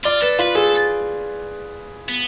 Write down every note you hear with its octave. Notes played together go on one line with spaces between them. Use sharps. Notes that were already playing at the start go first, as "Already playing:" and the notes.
F4 D5
A4 B4
F4 B4
G#4 A4
B3